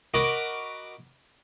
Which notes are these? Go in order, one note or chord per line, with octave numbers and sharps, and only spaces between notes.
F#4 A#4 D#5 A#5 B5 D6